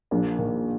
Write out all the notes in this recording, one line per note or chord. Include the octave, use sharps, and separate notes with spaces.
A#1 A#3 D4
D#3